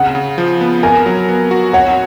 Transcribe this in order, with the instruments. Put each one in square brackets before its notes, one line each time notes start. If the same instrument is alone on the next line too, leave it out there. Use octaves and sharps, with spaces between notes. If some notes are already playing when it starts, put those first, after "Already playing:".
Already playing: [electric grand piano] C#3 [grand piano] F#5
[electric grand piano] C#3
F3
B3
[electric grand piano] A#4 [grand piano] G#5
[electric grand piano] F#3
B3
F#4
[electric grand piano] C#5 [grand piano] F#5